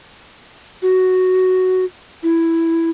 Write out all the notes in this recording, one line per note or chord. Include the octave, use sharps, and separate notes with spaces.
F#4
E4